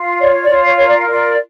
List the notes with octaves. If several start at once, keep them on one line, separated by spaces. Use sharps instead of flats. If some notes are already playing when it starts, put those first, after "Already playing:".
Already playing: F4
C#5 D5
D5
F4
C#5
A#4 C#5
D5
F4 D5